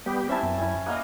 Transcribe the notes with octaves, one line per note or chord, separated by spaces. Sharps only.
G3 B3 G4 G5
C4 C#4 E4 E5 A5
F#2
E4 G#5
A#3 A#4 D#5 F5 F#5